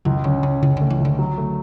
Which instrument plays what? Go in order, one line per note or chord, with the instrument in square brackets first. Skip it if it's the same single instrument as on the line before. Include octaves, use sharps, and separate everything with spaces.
[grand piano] C#2 [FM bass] F#3
[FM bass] D3 [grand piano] C#4
[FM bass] C#3 [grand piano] C#4
[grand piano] C#2 [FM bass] C#3
[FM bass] D3 [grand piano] A3
[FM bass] E3
[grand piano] C#2
[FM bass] D3
[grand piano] F#3
A3